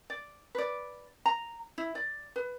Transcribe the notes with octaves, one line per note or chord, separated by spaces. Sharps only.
D5
B4 D5
A#5
E4
D5
B4